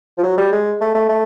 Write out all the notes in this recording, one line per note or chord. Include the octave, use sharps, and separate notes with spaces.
F3
F#3
G3
G#3
A3
A3
A3